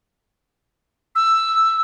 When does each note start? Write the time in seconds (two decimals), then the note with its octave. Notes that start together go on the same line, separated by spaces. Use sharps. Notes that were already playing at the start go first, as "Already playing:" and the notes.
1.15 E6